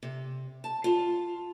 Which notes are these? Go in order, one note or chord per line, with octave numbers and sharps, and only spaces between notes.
C3
A5
F4